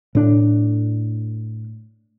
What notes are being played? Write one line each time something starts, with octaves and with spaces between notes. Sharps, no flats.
A2 D4